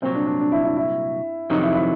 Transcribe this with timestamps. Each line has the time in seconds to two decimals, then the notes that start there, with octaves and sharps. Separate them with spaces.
0.02 C2 A#2 F#3 C4
0.15 D4
0.27 D4
0.40 D4
0.52 E4
0.64 E4
0.76 E4
1.50 F2 C3 D#3 F#3 D#4
1.62 E4
1.75 E4